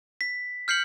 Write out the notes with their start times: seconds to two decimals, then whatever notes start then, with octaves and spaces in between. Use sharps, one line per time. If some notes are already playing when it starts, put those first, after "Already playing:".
0.21 B6
0.68 F6 G6 C7 C#7 F#7